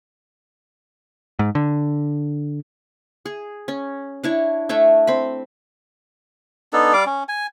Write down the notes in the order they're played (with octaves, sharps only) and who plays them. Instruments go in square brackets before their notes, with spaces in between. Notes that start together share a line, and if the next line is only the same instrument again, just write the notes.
[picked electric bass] G#2
D3
[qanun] G#4
C#4
D4 E4 C#5
A3 D4 C#5 E5
C4 B5
[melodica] B3 D4 D#4 A4
G3 D5 F5 D6
C#4
G#5